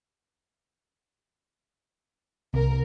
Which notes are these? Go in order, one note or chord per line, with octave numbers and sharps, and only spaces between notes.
C2 A#4